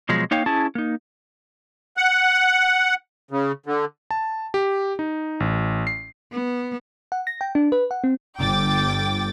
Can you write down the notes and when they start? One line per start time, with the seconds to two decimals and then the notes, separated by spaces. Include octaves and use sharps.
0.09 B2 F3 F#3 G#3
0.31 A#3 D#4 C#5 F5 G5
0.46 C#4 E4 G#4 A5
0.75 A#3 D#4
1.97 F#5
3.31 C#3
3.66 D3
4.11 A5
4.54 G4
4.99 D#4
5.40 A1
5.87 C7
6.33 B3
7.12 F#5
7.27 A#6
7.41 G5
7.55 D4
7.72 B4
7.91 F#5
8.04 C4
8.38 G1 G5 D6 A6